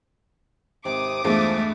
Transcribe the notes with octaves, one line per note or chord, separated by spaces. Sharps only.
G#1 C3 D6 D#6
E2 G2 F3 G#3 A3